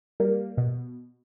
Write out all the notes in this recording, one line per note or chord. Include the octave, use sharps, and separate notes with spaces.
G3 A#3
B2